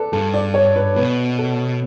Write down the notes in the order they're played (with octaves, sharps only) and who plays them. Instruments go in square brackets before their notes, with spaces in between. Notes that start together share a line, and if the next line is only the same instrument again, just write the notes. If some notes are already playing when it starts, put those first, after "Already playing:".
Already playing: [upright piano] A4 B4 D5
[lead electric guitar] G2 [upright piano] A4
[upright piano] D5
C#5
B4
[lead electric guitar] B2 [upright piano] B4
[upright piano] A4